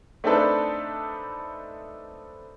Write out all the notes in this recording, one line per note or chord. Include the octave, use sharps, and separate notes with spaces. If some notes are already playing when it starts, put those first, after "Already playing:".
A3 C4 D4 D#4 A4 B4